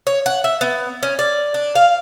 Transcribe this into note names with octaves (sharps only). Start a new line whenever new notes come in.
C#5
F#5
E5
B3
C#4
D5
D4
F5